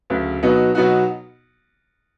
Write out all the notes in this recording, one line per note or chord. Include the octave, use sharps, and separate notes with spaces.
D2 C#3 F#3
B2 F#3 B3 D#4 F#4
B2 F#3 B3 D#4 F#4